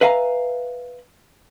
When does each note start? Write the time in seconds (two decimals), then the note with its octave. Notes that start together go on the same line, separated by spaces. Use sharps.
0.01 B4 E5 F5 G#5 A#5